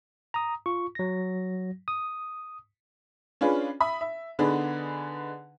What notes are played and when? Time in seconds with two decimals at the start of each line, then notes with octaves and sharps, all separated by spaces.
0.34 A#5 D#6
0.66 F4 C#6
0.95 F#3 A#6
1.88 D#6
3.41 C#4 D4 F4 G#4 B4
3.80 E5 B5 D#6
4.01 E5
4.39 D3 B3 D4 D#4 G#4 B4